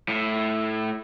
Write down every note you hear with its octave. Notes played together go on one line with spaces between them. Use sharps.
A2